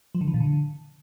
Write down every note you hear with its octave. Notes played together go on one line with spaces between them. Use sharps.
F3
D3
E3
A#2
D3